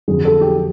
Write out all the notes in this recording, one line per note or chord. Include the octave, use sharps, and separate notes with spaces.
F2 D3 F#3 G#4
A4
G4